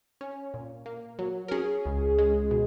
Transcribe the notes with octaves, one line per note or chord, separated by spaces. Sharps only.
C#4
A#2
A#3
F#3
A#4
C#4 G#4
C#2
G#3
B2